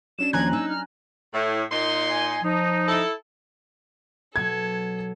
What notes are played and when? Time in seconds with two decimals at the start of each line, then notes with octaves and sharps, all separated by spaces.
0.19 F#3 C#4 D4 E7
0.33 D#2 F3 G#5 A#5 F#6 G#6
0.53 D#4 E6
0.70 F6
1.34 A2
1.72 A#2 D#4 C6
2.09 G#5
2.43 F3 D#4
2.87 E4 A4
4.36 B2 F#3 A4 G#6